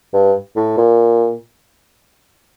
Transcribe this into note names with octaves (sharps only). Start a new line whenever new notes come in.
G2
A2
A#2